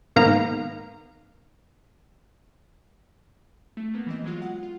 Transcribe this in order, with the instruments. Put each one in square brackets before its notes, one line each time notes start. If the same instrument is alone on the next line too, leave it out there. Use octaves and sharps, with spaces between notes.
[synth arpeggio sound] G#2 D#3 A#3 B3 F5 A#5
[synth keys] A3
A#3 B3
E3 C4 D#5
F#3 G#3 F4
F#5
F4